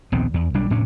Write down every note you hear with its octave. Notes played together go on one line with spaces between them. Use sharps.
A#1 D#2 B3 C4
E2
B1 G3 D4
F1 A2 C#4 D4